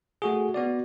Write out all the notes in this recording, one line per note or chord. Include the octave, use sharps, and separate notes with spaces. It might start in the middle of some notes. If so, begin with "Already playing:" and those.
A3 F#4 G#4
B3 F#4 D5